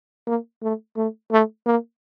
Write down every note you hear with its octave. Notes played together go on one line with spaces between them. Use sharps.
A#3
A3
A3
A3
A#3